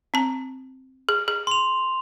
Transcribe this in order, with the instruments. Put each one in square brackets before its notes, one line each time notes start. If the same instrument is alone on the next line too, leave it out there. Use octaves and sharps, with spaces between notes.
[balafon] C4 A5
G#4
G#4
[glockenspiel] C6 F7